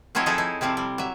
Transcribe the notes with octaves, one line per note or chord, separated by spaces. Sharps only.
F3 F#3 C4 E4 C#5 D#5
F3 D#4 E4 G#4 A4 E5
D#4 E4
C3 F3 G3 C4 E4
G3
F#3 E5